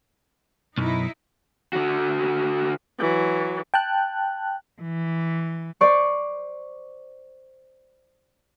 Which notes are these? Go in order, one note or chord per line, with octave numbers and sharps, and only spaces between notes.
B1 F#2 D#4 E4
D3 F#4
E3 F#3
G5 A5 F#6
E3
C5 D5 C#6